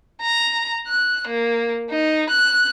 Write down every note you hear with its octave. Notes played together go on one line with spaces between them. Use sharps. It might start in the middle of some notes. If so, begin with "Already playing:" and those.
A#5
F#6
A#3
D#4
F#6